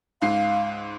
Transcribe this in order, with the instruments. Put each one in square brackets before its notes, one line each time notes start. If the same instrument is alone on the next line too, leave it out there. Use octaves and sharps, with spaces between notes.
[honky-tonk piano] C#2 G#2 C7 [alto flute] F5